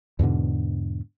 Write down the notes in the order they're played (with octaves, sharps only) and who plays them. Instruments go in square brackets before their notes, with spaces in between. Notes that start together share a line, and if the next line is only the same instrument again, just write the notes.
[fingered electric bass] E2 G#2 B2 D3